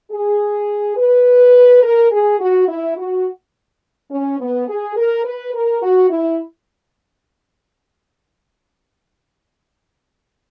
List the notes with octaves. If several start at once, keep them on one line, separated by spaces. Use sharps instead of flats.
G#4
B4
A#4
G#4
F#4
E4
F#4
C#4
B3
G#4
A#4
B4
A#4
F#4
E4